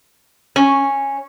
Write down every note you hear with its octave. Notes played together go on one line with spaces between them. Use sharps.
C#4